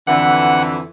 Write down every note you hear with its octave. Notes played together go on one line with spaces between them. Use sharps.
F2 D3 E3 F#5